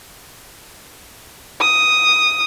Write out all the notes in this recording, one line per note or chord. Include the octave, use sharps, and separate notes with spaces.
D#6